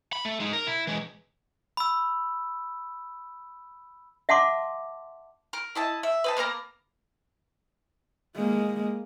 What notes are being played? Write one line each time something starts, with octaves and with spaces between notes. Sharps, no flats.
B5
A3
G#3 D#4
A#4
E4
E3 G#3
B5 E6
E5 F#5 A5 C6 D6
A#4
E4 D#5 A5
E5
B4 D#5 A5
A#3 B3 A#4 A#5
G#3 A#3